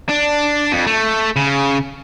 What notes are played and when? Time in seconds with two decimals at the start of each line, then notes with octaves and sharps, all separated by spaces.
0.09 D4
0.72 F2
0.87 A3
1.36 C#3